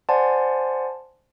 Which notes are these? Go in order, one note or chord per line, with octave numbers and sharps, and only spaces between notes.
C5 D5 F#5 G#5 A5 C6